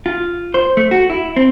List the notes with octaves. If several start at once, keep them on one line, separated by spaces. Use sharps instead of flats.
F4
C5
A3
F#4
E4
C4